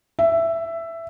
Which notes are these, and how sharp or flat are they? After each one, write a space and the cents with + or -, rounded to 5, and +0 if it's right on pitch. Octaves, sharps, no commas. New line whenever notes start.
E5 +10